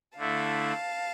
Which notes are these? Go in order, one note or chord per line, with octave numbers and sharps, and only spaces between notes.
D3 A3 E4 F5 A5